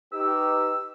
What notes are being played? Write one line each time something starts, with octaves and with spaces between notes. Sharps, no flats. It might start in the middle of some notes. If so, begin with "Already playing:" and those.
D#4 G4 B4 E6